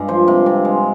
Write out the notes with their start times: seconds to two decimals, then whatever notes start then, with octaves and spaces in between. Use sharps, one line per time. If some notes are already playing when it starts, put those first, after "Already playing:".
Already playing: G2 G#3 D#5
0.08 F3 C5
0.28 C3
0.46 C3
0.65 G#3